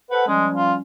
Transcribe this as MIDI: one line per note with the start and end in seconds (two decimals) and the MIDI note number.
0.11 0.26 69
0.11 0.23 71
0.11 0.26 72
0.11 0.26 78
0.28 0.82 53
0.28 0.82 55
0.28 0.46 56
0.28 0.82 61
0.56 0.73 65